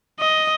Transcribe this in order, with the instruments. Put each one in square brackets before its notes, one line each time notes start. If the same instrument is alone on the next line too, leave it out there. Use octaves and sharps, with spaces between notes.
[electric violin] D#5